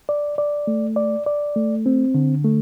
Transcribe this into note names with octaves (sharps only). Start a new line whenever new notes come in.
D5
D5
A3
D5
D5
A3
C4
D3
A3